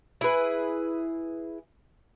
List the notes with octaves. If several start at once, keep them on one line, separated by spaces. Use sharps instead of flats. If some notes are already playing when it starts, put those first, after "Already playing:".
E4 G#4 B4